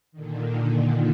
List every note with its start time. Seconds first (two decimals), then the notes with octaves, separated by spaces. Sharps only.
0.12 A#2 D3 D#3